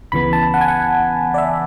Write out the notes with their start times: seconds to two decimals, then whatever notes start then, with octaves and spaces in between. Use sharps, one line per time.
0.12 C#2 C#3 E3 B3 B5
0.33 A5
0.54 F#5
0.61 G#5
0.68 F#5
1.34 D5
1.38 E5